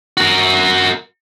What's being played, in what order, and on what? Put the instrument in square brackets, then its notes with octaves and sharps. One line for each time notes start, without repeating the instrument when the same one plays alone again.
[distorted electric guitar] F#4 A#4